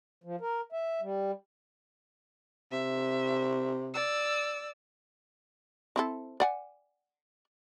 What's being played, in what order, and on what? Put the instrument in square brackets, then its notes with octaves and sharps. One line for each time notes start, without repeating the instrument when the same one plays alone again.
[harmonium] F3
A#4
E5
G3
[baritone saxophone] C3 [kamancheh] E5
[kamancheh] D5 E6
[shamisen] C4 E4 A4
D5 F#5 G#5